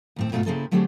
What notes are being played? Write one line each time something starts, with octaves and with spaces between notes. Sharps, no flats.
D#2 A2 C4
G#2 B2 A3 E4 F4
C#3 A#3 C4 E4 G#4 A4
D3 F#3 A3 C4 G4 G#4